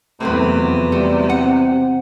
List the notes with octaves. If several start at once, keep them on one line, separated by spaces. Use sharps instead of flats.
E2 C3 F#3 A3 A#3 C4 B4
F2
G3 A3
C4 F#5